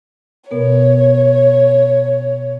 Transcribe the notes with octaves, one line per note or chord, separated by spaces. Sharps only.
B2 B3 A#4 C#5